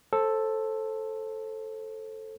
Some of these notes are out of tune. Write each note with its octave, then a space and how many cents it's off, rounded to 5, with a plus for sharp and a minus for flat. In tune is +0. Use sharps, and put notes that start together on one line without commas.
A4 +0 C5 +25